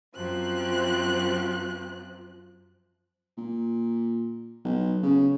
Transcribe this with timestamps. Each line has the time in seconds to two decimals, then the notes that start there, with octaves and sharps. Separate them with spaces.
0.15 F#2 F3 C4 F#6
3.38 A#2
4.64 B1
5.03 C#3